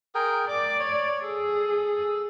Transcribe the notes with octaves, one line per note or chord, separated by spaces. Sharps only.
G#4 A#4 G5
D5 D6
C#5
G#4 A4